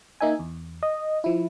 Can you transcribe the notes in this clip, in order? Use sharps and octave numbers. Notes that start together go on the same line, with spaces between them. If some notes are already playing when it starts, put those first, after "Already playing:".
A#3 D#4 E5 G#5
E2
D#5
F3 E4